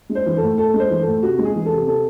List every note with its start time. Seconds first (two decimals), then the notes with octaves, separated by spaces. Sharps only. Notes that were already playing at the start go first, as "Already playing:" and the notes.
0.09 G#3
0.15 C5
0.26 E3
0.37 A2 A4
0.58 A2 A4
0.74 G#3
0.80 C5
0.90 E3
1.02 A4
1.07 A2
1.23 C3 F#4
1.39 G#3
1.45 G#4
1.55 E3
1.66 A4
1.72 C3
1.87 C3 A4